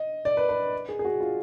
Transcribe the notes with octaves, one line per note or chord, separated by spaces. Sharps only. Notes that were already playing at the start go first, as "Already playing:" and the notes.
Already playing: D#5
D5
B4
B4
G#4
G#4
F#4
F4